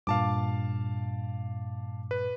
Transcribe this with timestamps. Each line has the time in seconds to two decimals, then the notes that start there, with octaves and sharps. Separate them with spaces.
0.07 G2 A#2 F5 A5 D6
2.11 B4